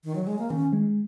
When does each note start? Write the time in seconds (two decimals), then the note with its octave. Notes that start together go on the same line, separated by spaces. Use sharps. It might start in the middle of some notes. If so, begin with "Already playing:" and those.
0.04 D#3
0.15 F#3
0.27 G#3
0.39 A#3
0.50 D#3 C#4
0.72 G#3